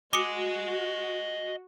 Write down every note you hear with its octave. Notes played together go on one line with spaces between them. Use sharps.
F#4 D#5 G#5 D6 D#6 C#7